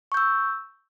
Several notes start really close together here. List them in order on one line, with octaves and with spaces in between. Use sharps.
C#6 G6 E6